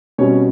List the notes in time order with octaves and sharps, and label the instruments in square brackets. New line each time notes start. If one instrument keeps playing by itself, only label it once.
[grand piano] B2 G3 C4 C#4 C#5